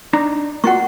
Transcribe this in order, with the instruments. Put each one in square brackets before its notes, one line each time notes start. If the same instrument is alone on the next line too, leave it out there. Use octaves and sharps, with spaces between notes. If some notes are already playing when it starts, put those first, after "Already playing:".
[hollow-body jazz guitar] D4 D#4 A#5
[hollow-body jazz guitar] A#3 F4 F#4 [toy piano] F#5 C#6